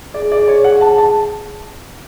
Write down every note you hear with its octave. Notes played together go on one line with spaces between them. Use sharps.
G#4 D5
D5
C#5
F#5
A5
A5